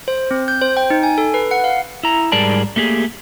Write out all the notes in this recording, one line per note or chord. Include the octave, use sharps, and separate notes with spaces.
C5
C4
G6
C5
G5
D#4
G#5
A4
B4
F#5
F5
E4 A#5
G#2 G3 G#4 A#4 D5 A5
A3 A#3 G4 G#4